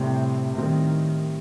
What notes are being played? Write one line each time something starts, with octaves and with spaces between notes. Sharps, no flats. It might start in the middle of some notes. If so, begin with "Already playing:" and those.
Already playing: A2 C3 G3 C4
A2 D#3 G3 C4